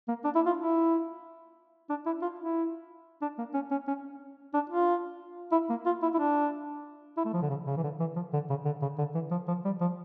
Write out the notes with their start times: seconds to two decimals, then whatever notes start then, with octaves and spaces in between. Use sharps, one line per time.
0.08 A#3
0.24 D4
0.35 E4
0.46 F4
0.57 E4
1.90 D4
2.06 E4
2.22 F4
2.39 E4
3.22 D4
3.38 A#3
3.54 C#4
3.71 C#4
3.87 C#4
4.54 D4
4.70 F4
5.52 E4
5.69 A#3
5.86 F4
6.02 E4
6.14 E4
6.19 D4
7.17 E4
7.25 A3
7.33 F3
7.42 D3
7.50 C#3
7.67 C#3
7.77 E3
7.83 D3
8.00 E3
8.16 F3
8.33 D3
8.50 C#3
8.65 D3
8.82 C#3
8.98 D3
9.15 E3
9.31 F3
9.48 F3
9.65 G3
9.81 F3